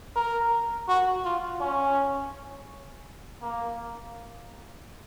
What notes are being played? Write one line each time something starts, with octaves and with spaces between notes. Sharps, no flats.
A#4
F#4
F4
C#4
A#3